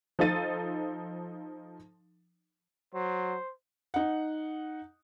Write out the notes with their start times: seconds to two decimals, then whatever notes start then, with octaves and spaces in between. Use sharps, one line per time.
0.19 F3 D#4 A4 F5 A6 D#7
2.94 F#3 C5
3.94 D#4 F#5